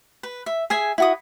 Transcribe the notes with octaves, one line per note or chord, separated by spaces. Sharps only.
B4
E5
G#4 E5 G#5
E4 F#4 D#6